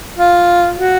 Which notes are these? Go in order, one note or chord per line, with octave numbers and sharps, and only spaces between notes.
F4
F#4